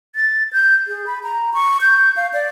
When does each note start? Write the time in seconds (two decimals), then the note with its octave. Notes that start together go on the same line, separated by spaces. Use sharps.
0.15 A6
0.53 G6
0.88 G#4
1.06 B5
1.23 A#5
1.54 C#6
1.81 G6
2.16 F5
2.33 D5